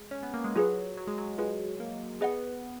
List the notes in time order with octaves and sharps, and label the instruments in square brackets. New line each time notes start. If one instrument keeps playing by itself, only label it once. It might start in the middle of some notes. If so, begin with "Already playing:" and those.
Already playing: [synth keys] G#3
C#4
B3
A#3
G#3
[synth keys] F#3 [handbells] F4 G#4 B4
[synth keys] F#3
G#3
F#3
[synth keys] G#3 [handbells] F4 G#4 B4
[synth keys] A#3
[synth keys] B3 [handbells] G#4 D#5 F#5